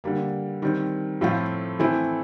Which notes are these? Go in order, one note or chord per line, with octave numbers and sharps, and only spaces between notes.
D3 G3 A#3
D#3 G3 C4
A2 F3 A3 C4 F4
E3 A3 C4 E4